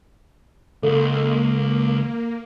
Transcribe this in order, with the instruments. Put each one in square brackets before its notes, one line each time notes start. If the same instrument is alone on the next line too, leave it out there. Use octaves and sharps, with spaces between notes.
[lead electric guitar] C#2 [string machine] A#3 [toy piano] A4